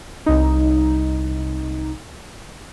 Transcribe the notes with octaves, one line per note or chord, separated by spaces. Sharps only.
C2 D#4